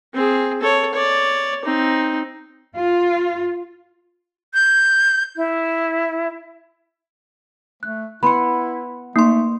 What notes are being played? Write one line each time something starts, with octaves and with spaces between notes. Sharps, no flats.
C4 G#4
A4 C#5
C#5 D5
C4 D#4
F4
G6
E4
A3 F#6
B3 E4 F#5 B5 C6
A3 A#3 D#4 C6